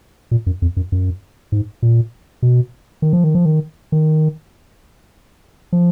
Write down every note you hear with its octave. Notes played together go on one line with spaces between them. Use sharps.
A#2
F#2
F2
F#2
F#2
G#2
A#2
B2
D#3
F3
D#3
F3
D#3
D#3
F3